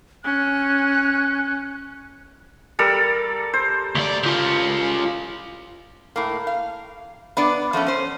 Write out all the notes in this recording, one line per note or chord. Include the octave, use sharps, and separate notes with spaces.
C#4 F#6
G3 A4 A#4
C5
D2 D5
C#3 F4
A2 A#3
F5
B3 D4 D5
F3 A3 B3 C#4
C#4 C5